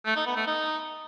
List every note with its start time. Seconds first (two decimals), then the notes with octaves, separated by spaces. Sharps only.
0.06 A3
0.16 D#4
0.26 B3
0.37 A3
0.47 D#4